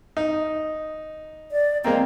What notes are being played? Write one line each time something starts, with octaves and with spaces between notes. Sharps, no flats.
D#4
D5
G#3 A#3 C4 A#5